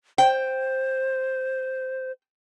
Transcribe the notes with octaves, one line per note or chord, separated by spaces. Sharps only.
C5 G5